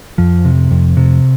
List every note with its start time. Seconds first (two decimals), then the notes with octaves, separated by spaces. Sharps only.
0.18 F2 F3
0.45 C3
0.71 F2
0.97 C3